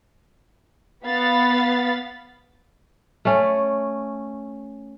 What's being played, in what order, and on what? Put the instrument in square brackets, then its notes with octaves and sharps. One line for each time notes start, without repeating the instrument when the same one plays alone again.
[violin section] B3 F5 B5 A6
[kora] A3 C#4